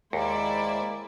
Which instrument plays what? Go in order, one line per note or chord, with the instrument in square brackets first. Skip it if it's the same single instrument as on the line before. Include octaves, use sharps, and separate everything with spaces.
[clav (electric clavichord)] D#2 [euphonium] G#3 [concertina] A#3 [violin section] E4 C5 D5